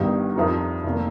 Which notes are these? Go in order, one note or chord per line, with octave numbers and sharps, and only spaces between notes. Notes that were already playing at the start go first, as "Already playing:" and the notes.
Already playing: G1 G2 D#3 G3 D#4
F2 F3 D#4 G4 A#4
F1 D#3 A#3